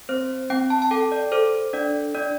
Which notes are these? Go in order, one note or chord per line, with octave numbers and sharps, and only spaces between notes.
C4 C5
C4 G5
A5
A5
A4 G5
D5
A4 C5
D4 D5
D4 D5